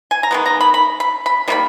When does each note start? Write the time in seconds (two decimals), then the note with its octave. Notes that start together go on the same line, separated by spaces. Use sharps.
0.11 G#5
0.23 A#5
0.31 D#3 G#3 B3
0.46 A#5
0.61 B5
0.74 B5
1.00 B5
1.26 B5
1.48 D#3 G3 A#3 B5